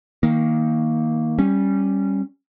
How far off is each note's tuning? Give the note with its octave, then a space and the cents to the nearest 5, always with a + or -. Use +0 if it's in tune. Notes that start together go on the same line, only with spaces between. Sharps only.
D#3 +20 A#3 +0
G3 +0 C#4 -10